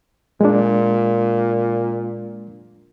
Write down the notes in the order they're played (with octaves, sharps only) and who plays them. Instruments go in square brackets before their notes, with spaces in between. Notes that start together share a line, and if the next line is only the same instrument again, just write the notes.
[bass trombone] A#2 [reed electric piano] G#3 D4